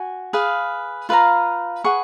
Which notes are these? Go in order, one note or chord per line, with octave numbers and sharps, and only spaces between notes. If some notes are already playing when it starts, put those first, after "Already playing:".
Already playing: F#4 G#5
G#4 B4 F5
F4 B4 F5 A#5
G#4 B4 F#5 C#6